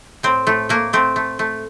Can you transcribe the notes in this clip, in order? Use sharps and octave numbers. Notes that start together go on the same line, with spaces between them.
A2 C4
A2 A3
A3 A#3
A3 C4
A3
A3